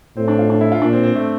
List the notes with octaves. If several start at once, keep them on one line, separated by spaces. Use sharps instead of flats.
A2 C4
D4
F4
D4
E4
F4
A#2 D4
C4
C4
A3